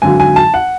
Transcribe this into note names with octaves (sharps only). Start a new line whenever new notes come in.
G#1 F#2 D3 F#3 G#5
G#5
A5
F#5